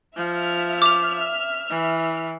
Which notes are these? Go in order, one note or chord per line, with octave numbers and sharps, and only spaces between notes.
F3 E5 F6
D6 F7
E3